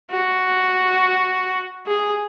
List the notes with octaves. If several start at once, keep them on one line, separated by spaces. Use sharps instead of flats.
F#4
G#4